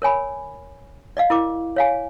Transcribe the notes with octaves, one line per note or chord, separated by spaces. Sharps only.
A#4 C#5 G#5 B5
D5 D#5 F5
E4 A#4 D6
C#5 F5 G#5